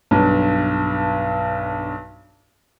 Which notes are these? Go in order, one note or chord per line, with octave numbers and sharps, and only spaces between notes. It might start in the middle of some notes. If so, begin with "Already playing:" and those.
B1 G2